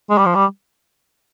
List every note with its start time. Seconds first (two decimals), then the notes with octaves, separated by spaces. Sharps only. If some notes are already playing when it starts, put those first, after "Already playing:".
0.10 G#3
0.18 G3
0.26 F3
0.35 G3